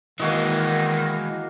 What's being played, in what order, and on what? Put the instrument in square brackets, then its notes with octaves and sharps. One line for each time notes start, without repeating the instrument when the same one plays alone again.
[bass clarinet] D#3 [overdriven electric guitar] E3 G#3 [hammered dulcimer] A#3 F#4 D#5